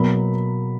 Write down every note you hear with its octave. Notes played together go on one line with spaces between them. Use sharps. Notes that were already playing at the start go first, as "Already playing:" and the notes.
Already playing: B2 F#3 A#3 B5